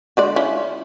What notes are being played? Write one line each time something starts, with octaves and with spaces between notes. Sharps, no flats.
D3 G#3 D5
C#4 E4 F4